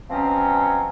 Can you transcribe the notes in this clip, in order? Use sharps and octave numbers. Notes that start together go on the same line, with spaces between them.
B2 F3 F#3 C4 C#4